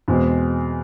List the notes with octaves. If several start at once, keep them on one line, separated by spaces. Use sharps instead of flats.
E2 B2 G#3 C4